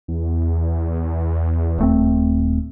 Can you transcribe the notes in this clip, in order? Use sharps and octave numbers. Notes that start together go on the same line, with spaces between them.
E2
D#1 A3 C4